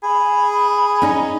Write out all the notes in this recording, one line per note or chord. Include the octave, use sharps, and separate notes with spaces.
G#4 B5
C#4 D#4 D#5